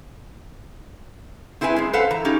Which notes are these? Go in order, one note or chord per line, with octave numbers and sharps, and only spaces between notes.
C4 E4 G#4 B4 G#5
F#2 G#3
A4 B4 C5 F5 F#5
E3 A#5
C#4 D#4 G4